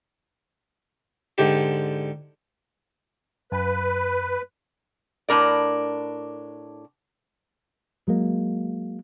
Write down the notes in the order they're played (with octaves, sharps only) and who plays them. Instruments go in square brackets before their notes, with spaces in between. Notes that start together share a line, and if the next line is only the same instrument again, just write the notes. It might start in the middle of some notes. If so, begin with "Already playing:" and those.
[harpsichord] G#2 D3 D4 G4
[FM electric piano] F#2 [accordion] B4
[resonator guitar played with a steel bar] A2 D4 A#4 D5
[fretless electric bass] F#3 G#3 A#3